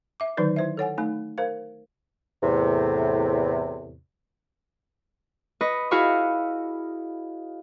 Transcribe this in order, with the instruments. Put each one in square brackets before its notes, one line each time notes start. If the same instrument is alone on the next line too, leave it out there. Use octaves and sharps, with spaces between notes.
[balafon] E5 D6
D3 D#3 F#3 D#4 B4 D5
E4 C5 E5
A4 C#5 F#5 G#5
A3 D#4 G#5
A#4 C5 F5
[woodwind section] E2 A2 C3
[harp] B4 D#5 C#6
E4 F#4 G#4 F5 B5 C#6